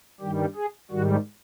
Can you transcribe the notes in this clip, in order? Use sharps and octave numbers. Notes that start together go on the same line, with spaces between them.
G2 D#3 G3 G4
G#4
G#2 D#3 G3 F#4